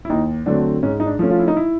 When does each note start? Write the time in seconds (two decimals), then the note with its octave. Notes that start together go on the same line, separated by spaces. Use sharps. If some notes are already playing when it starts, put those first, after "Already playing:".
0.05 E4
0.10 D#2 D#4
0.46 D3 F#3 A3 C4 D4
0.83 G#2 C#4
1.00 D#4
1.06 D4
1.19 F3 A3 C#4
1.31 F4
1.39 E4
1.48 D#4
1.57 E4